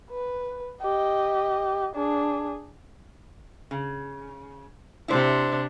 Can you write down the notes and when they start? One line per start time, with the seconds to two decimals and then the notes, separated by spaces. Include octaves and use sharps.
0.10 B4
0.82 G4 D#5
1.95 D4 G#4
3.71 C#3
5.08 C3 D4 E4 C5